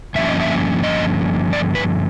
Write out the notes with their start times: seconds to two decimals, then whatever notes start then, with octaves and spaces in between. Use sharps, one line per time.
0.15 G2 D3 F3 A#3 C#4 E5
0.28 D#5
0.40 E5
0.83 D#5
1.53 D5
1.75 B4